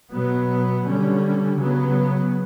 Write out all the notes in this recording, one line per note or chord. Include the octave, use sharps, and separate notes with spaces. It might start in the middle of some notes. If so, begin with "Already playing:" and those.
B2 F#3 B3
D3 G3 C#4
C#3 F#3 B3